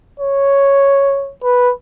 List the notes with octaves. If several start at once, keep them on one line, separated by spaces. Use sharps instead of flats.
C#5
B4